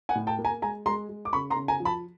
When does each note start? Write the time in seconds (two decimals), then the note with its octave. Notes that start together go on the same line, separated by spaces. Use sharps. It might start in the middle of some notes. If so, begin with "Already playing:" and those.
0.09 F#5 G#5
0.15 A2
0.27 G5 A5
0.39 A#3
0.45 G#5 A#5
0.62 G#3 G#5 A#5
0.86 G#3 A#5 C6
1.09 G#3
1.25 D6
1.33 C#3 B5 C#6
1.50 A#5 C6
1.56 C#3
1.68 G#5 A#5
1.80 F3
1.85 A5 B5